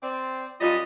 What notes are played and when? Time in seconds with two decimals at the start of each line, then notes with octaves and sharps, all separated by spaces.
0.03 C4 D5
0.61 F#2 G3 F4 D#5